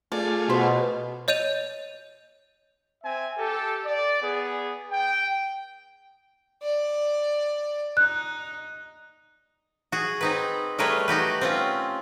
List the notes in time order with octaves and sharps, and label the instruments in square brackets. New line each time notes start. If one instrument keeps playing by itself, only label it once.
[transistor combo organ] A3 F4 G#4 [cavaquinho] D5
[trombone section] B2 [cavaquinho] C5 B5
[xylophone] C#5 D#5 G6 D#7 F7
[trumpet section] C4 E5 G#5
G4 A4
D5
B3 G#4
G5
[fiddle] D5
[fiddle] D#4 [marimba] F#6
[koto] F#4 G#4
C4 D#4 B4
G3 A3 G#4 A#4 B4 C#5
D#4 F#4 G4 B4
C4 C#4 F4